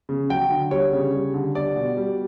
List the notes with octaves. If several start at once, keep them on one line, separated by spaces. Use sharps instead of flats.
C#3
F#3 G5
D3
G3 C#5
C#3
G3
D3
G3 D5
B2
G3